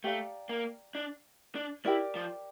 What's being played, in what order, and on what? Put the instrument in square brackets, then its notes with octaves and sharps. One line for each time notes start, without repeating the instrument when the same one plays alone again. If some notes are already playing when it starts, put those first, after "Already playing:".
[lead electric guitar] A3 [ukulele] G4 D5 F5 A#5
[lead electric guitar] A#3
D4
D4
[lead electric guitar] E4 [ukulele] G4 A#4 D5
[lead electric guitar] F3